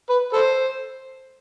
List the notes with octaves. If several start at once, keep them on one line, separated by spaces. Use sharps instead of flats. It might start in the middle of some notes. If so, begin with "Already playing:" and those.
B4
A4 C5